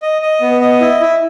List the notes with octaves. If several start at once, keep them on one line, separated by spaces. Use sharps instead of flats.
D#5
D#5
B3
D#5
E4
E4